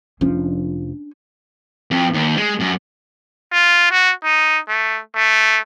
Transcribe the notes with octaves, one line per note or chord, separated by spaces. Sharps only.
F1 F3 C#4 D4
F2
D#2
G#3
F#2
F4
F#4
D#4
A3
A3